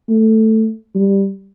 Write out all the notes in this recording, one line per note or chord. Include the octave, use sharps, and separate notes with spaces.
A3
G3